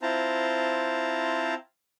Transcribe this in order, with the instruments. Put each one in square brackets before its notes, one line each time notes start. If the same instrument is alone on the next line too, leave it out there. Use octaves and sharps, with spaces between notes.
[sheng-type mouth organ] C4 E4 F4 C5 A5 A#5